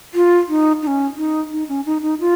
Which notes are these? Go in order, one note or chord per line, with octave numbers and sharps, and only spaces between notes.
F4
D#4
D#4
C#4
D#4
D#4
C#4
D#4
D#4
F4